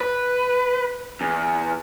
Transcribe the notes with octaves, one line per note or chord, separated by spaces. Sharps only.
B4
E2